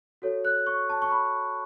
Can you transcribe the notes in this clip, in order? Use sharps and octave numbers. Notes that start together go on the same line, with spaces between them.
F#4 A4 C#5
F#6
C#6
A5
C#6
B5